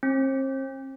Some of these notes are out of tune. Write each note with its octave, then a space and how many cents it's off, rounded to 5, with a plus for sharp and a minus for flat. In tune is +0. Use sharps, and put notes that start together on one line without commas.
C4 +40